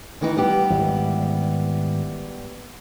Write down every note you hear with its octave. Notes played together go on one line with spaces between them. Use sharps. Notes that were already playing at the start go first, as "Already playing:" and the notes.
D#3 E3 D#4
G3 B3 G4
G#1 E3